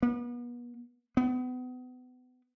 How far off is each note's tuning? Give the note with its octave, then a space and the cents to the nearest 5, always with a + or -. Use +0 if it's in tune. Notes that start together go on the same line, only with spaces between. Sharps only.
B3 -35
B3 +30